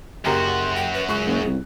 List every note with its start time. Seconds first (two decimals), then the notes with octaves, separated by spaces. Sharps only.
0.25 F#1 F#2 F#4 G4 A#4 C6
0.76 G5
0.94 B4
1.08 C#2 G#4 C#6 F#6
1.27 F#1
1.46 C2